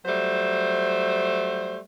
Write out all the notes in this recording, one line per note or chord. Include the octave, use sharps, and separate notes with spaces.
F#3 G3 A3 C5